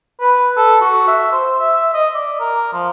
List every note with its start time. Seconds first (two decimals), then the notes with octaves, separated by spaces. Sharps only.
0.20 B4
0.57 A4
0.81 F#4
1.07 E5
1.32 C5
1.59 E5
1.94 D#5
2.15 D5
2.40 A#4
2.73 F3